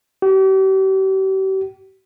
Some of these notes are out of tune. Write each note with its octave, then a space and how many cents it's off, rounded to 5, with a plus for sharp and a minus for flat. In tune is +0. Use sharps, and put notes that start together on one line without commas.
G4 -40